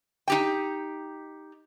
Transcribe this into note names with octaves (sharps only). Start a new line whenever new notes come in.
D#4 G4 G5